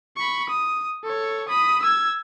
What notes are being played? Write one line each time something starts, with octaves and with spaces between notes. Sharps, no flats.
B5 C#6
D#6
A4 C#5
B5 D#6
E6 G#6